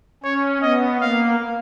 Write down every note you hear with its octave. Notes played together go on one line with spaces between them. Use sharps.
C#4 C#5
B3 D#5
A#3 F5